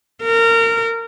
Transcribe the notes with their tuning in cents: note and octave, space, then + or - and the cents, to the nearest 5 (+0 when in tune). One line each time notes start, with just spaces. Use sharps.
A#4 -25